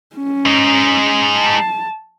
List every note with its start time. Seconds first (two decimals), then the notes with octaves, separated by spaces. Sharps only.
0.16 C#4
0.46 G#3 D#4
1.35 A5